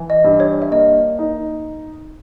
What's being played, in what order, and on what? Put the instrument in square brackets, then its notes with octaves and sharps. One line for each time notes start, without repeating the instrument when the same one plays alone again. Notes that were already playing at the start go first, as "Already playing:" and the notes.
Already playing: [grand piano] E3
[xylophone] D#5
[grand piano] G2
[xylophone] C#5
E5
[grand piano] A#3 [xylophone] D#5
[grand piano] D#4